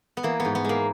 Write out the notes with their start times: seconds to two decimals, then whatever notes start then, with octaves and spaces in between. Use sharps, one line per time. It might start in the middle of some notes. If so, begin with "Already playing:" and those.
0.17 B3
0.23 E3 A#3
0.40 B3
0.45 G#2
0.55 B3
0.65 G#3 A#3